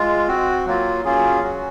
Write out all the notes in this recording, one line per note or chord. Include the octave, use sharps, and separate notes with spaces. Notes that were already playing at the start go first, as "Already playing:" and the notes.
Already playing: G#3 F4
C4 F#4
F#3 A#3 F4
F#3 A#3 C#4 F4 G#4
F#3 C#4 F#4